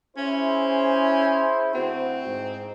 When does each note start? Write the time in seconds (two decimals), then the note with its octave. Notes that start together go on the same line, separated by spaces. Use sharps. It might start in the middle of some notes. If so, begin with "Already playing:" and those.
0.17 C#4 E4 G#4 C5
1.75 D2 C4 E4 F#4
2.26 G#2